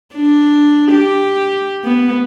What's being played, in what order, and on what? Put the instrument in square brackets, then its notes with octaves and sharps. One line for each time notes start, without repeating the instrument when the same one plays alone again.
[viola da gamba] D4
G4
B3